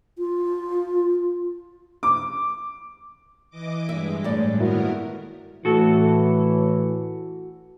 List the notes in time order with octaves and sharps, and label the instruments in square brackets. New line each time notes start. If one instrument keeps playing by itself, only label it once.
[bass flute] F4
[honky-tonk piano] D6
[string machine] E3 D#5 D6
[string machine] G2 G#3 [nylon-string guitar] E5
[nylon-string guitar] A2 D5
[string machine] D#3 B3 A#4 [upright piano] A#3 E4 F#4
[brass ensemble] A2 E3 [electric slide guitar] F#4 A4